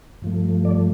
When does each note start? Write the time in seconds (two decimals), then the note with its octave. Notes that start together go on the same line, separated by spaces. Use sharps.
0.22 G2 F3 A3
0.65 D5